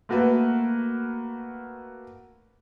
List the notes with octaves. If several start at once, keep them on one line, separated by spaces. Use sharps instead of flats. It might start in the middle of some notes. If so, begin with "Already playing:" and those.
A3 A#3 F#4 A#4 B4